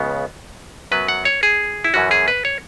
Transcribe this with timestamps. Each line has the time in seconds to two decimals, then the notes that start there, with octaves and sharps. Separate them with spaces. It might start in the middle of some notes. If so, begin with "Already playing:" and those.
Already playing: C#2 C#3 B3
0.91 F#2 F#3 B3 B4
1.08 F#5
1.25 C#5
1.43 G#4
1.84 E4
1.94 F#2 E3 C#4 F#4
2.11 G#4
2.28 B4
2.45 C#5